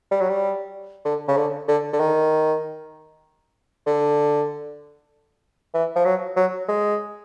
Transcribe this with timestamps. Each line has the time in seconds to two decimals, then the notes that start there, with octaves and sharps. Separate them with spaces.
0.11 G3
0.21 F#3
0.29 G3
1.05 D3
1.28 C#3
1.37 D3
1.68 D3
1.93 D3
2.00 D#3
3.86 D3
5.74 E3
5.96 F3
6.05 F#3
6.36 F#3
6.68 G#3